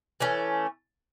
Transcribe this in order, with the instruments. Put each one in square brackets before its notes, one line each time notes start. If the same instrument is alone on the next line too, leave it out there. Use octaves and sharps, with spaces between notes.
[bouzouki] E3 A3 C#4